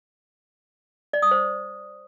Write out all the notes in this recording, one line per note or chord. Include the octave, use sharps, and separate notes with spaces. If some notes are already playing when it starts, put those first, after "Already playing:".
D5
D#6
C5